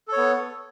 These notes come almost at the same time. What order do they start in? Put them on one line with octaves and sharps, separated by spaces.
A4 C#5 B3